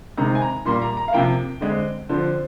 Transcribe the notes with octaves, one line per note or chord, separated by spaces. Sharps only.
C3 D#3 G#3 C4 A#5
G#5
A#5
A#2 G3 A#3 C6
A#5
A#5
F5
C3 F3 A#3 G5
D3 G#3 C4
D3 F3 C4 C5